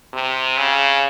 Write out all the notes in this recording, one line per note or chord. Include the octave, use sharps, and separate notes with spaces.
C3
C#3